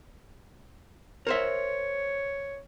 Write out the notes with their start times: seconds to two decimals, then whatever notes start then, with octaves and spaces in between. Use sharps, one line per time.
1.27 A#4 C5 C#5 E5